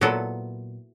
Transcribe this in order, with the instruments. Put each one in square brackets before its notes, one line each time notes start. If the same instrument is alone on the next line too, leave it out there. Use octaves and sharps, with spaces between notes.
[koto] A#2 F#3 B3 E4 A4